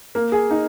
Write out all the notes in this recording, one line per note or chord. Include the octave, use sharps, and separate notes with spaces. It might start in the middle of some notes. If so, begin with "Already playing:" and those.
A#3
G#4
D#4